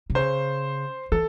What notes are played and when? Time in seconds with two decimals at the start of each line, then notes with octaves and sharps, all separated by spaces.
0.10 C3
0.15 C#3 C5
1.12 E3 A4